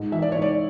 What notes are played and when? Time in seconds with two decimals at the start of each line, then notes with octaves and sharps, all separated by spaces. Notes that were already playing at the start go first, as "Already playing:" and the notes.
Already playing: G#2
0.12 E3 E5
0.22 D5
0.32 G#2 C#5
0.42 D5